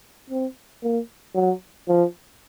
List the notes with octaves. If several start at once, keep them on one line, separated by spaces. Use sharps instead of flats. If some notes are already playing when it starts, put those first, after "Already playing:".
C4
A#3
F#3
F3